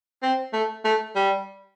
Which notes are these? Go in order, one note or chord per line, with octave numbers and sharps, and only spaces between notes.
C4
A3
A3
G3